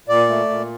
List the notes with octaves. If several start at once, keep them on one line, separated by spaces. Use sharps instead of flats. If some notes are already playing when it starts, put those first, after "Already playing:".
A#2 D5
A3
A#2